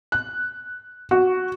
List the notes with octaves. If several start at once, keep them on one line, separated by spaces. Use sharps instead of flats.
F#6
F#4